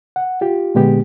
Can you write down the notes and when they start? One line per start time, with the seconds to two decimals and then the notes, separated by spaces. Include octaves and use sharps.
0.16 F#5
0.41 F4 G4
0.75 A#2 D3 G#3 B3 G4